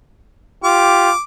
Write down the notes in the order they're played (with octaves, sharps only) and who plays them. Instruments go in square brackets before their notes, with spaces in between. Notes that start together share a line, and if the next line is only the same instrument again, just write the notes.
[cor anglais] F4 [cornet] G4 [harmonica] D6